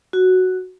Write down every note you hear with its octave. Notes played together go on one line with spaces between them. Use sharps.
F#4